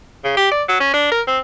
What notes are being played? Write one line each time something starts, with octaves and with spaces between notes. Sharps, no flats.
C#3
G4
D5
F#3
C#4
D4
A#4
C4